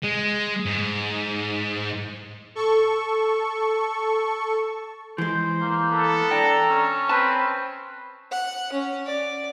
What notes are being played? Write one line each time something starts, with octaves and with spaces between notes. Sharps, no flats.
G#3
G#2
A4 C#6
E3 G#3 C5
A#3
B3 A4
D4 G5 A#5
C#4
C4 B4 G#5 A5
F#5
C#4
D5